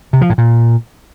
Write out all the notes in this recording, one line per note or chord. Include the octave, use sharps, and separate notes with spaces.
C3
F3
A2
A#2